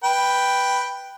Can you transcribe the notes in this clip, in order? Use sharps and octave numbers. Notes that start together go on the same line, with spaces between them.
B4 G5